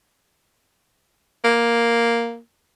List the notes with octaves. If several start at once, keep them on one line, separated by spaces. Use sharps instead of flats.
A#3